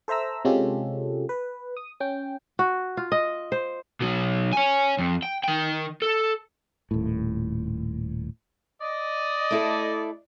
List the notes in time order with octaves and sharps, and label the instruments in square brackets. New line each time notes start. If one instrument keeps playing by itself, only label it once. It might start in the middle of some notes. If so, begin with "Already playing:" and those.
[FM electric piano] A4 C5 E5 A#5 E6
C3 G#3 C#4 F4 G4 A4
B4
D#6
C#4 G5
[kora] F#4
F4
D#5
C5
[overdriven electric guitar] B2 F#3
C#5 G#5
F2
G5
D#3 G5
A4
[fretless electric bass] D#1 A2
[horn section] D5 D#5
[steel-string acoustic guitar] A3 E4 A4